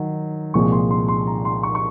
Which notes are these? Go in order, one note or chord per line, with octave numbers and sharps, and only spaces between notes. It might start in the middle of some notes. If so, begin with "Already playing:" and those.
Already playing: D#3 F#3
C2 A#2 F3 G#3 C#6
C6
C6
C6
A#5
C6
C#6
C#6